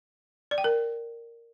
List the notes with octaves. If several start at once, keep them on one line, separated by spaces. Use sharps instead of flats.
D5
G5
A#4